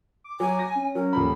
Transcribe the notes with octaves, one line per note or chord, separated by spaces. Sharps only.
D6
F#3 G#5
A#6
C#4
F#3 A#4
D#1 F3 B5